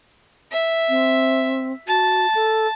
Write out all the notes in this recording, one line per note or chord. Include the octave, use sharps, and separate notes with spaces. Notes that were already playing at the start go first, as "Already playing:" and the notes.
E5
C4
F#4 A5
A4